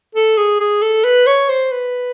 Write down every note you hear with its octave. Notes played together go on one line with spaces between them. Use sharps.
A4
G#4
G#4
A4
B4
C#5
C5
B4